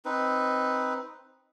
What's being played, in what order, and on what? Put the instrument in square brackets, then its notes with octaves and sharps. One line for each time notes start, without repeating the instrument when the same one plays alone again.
[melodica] C4 D#4 B4